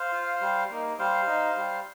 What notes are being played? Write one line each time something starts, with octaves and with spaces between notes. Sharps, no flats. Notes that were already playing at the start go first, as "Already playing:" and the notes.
Already playing: C5 F5
F4
G3
A#3 D#4
G3 C5 F5
D#4
G3